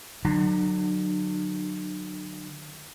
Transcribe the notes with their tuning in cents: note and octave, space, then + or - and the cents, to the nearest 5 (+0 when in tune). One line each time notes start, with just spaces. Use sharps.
D3 +25 F#3 +0 D4 +45